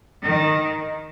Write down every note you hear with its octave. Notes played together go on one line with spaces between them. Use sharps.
D#3